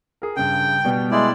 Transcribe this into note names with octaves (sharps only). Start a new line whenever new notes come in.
G#4 A#4
G2 C#3 G5
B2 G3 B3
G#3 E4 D5